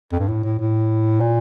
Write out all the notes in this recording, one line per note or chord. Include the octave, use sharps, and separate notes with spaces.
F2
G2
A2
A2
A2
A#2